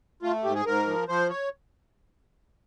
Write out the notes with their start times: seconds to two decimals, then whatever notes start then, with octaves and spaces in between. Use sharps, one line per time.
0.22 A3 F4
0.44 G#2 G4
0.55 G#4
0.66 G#2 A#4
0.87 F3
1.08 F3 C5
1.30 C#5